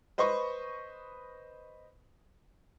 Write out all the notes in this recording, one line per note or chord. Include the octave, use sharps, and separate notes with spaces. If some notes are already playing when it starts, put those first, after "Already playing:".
B4 C5 D#5 B5 C#6